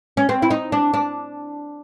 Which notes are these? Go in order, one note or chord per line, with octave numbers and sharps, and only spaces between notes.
C#4
C4
E4
D#4
D4
D4